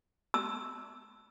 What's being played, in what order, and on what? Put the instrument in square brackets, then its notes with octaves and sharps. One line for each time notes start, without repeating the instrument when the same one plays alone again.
[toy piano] E6